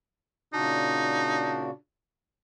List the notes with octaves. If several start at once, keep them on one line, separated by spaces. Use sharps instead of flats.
A#2 C#3 D4 D#4 F#4